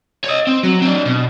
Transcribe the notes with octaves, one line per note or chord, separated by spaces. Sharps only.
C#5 D#5
C4
F#3
C4 D4
B2